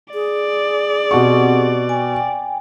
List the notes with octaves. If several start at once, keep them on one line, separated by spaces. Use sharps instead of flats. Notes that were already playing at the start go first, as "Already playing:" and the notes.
G#4 D5
B2 C4 G4 F#5 C#6
G5 G#5